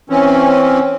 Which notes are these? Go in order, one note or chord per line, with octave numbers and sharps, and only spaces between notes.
E3 C4 C#4